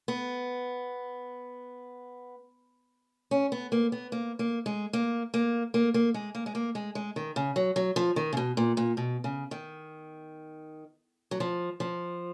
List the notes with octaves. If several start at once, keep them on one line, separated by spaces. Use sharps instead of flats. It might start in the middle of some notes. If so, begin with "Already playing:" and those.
B3
C#4
B3
A#3
B3
A#3
A#3
G#3
A#3
A#3
A#3
A#3
G#3
A#3
G#3
A#3
G#3
G#3
D#3
C#3
F#3
F#3
F3
D#3
C#3
B2
A#2
A#2
B2
C#3
D#3
F#3
F3
F3